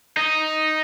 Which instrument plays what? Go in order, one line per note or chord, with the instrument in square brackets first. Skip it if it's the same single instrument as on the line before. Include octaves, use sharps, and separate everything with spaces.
[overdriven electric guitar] D#4